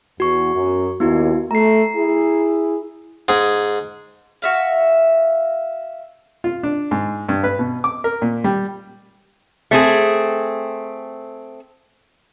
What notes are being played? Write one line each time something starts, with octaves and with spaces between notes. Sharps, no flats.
E2 F#4 C#6
F#2
D#2 B3 E4 F#4
A3 A#5 C7
E4 G#4
G#2 G#4
F#4 E5 F5
F4
D4
G#2
G2
B4
B2
D6
A#4
A#2
G3
A3 C4 G#4